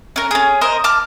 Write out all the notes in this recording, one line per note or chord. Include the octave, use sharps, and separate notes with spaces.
C#4 A#4
C#4 G#4
A#4 C5 D#5
A5 D6 F6